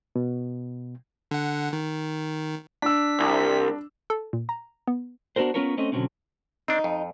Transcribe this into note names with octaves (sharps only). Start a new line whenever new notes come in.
B2
D3 F#5
D#3
D4 E6 B6
C2
A4
A#2
A#5
B3
B3 D4 F#4 A#4 C5
B3 C#4 F4 A#4 B4 C#5
A3 C4 C#4 D#5
B2 D3 F3 F#3 C4 C#4
C4 D4 D#4
F2